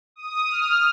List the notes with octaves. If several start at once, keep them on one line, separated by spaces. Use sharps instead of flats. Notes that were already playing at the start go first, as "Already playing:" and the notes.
D#6
F6